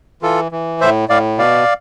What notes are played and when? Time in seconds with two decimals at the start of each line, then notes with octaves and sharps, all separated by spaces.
0.22 E3 F4 A4
0.52 E3
0.81 A2 C5 E5
1.09 A2 D5 F5
1.38 B2 D5 F5